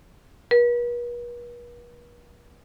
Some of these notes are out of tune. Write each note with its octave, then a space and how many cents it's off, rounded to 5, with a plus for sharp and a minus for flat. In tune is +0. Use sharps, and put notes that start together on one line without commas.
B4 -45